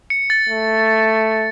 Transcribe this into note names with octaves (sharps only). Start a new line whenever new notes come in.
C#7
A6
A3